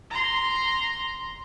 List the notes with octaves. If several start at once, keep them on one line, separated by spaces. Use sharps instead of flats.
A#5 C6